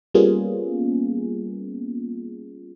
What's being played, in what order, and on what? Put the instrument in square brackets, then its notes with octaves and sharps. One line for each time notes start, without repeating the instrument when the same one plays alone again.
[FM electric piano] G3 A#3 B3 C#4 F4 G#4